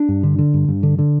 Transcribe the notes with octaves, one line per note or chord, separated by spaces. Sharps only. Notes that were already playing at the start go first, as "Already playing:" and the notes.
Already playing: D4
G2
D3
D3
G2
G2
D3
D3